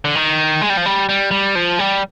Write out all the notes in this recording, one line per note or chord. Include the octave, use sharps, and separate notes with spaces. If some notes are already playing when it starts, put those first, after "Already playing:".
D3
D#3
G#3
G3
F3
G3
G3
G3
F3
G3